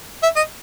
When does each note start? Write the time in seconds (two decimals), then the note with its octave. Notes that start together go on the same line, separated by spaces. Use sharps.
0.23 E5
0.36 D#5